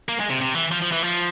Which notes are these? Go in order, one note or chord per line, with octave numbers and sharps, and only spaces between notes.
A#3
G#3
C3
C3
E3
F3
F3
E3
F3